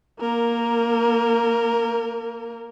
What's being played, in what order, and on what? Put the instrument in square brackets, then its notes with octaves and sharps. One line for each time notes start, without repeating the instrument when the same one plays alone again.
[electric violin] A#3 A#4